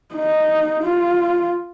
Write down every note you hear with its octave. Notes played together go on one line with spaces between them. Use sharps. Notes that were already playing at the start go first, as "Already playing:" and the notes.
D#4
F4